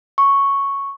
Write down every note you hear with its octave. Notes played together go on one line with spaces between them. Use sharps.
C#6